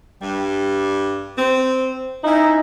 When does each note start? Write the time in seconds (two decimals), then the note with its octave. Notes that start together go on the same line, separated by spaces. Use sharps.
0.21 G2 G3
1.37 C4
2.24 C#4 D#4 E4